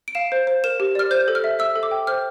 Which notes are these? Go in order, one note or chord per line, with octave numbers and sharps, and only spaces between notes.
D7
F5 E7
C5
C5
A#4 E7
G4
D5 F6
C5 G6
A4
F6
E5
E5 E6
A4
D6
G5
C5 F6